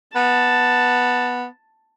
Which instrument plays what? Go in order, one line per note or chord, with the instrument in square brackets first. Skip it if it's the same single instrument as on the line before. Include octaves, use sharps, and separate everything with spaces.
[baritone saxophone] B3 [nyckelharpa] A5